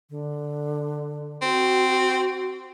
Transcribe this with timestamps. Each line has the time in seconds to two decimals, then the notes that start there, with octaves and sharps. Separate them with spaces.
0.10 D3
1.42 C4 F#4